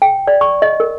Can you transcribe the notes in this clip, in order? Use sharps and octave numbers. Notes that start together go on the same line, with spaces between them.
G5
D5
C#6
D#5
A#4